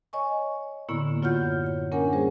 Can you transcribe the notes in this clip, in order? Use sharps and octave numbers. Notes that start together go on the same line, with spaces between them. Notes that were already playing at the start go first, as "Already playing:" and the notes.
C#5 D#5 G#5 C#6
A2 D3 A#3 B3 E4
F#2 F4 C#5 F#5 F6 G6
C#5
A#3 C#4 D4 A#4 F#5 G#5
G3 G#4 C5